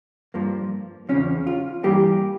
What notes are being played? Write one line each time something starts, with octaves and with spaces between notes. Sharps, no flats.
G2 F3 A#3
E2 C#3 F3 C#4
F4
G2 E3 G3 A#3 G4